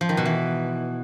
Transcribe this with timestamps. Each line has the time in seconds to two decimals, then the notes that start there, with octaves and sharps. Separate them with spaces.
0.01 F3
0.09 D#3
0.17 B2
0.25 E3